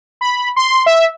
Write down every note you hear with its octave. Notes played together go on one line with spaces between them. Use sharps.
B5
C6
E5